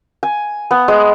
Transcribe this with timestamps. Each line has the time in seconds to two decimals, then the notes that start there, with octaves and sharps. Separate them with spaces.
0.23 G#5
0.71 B3
0.88 G#3